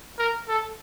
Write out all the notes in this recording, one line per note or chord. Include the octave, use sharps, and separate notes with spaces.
A#4
A4